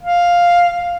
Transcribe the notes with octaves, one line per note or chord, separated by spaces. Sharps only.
F5